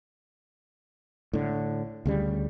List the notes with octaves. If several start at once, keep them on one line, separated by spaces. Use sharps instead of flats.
A2 D3
D2 C#3 G3